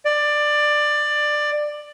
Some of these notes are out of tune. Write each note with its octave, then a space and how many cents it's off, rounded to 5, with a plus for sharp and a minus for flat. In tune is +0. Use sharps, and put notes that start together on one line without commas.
D5 +15